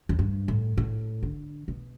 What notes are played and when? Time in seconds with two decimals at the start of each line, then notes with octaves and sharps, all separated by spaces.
0.09 E2
0.19 G2
0.48 A2
0.77 A2
1.23 D3
1.68 B2